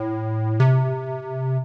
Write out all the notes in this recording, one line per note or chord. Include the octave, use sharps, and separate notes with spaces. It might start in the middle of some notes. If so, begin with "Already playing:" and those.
Already playing: A2
C3